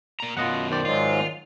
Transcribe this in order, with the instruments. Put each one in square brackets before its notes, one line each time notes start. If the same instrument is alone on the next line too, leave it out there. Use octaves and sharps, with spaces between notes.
[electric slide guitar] A#2 A#5
[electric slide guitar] F#2 B2 [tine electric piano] F4 D#5 F#5
[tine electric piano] D#3 C5 D5
[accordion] G#2 F#3 G#3 [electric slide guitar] F4